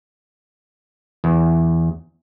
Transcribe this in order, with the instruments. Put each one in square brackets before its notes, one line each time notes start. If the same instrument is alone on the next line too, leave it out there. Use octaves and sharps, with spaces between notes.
[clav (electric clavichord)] E2